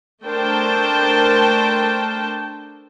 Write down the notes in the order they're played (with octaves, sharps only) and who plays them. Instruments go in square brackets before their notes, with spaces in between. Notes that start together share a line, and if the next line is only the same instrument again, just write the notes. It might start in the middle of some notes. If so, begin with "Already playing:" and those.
[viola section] A3 D4 A#4 C5 G5 A5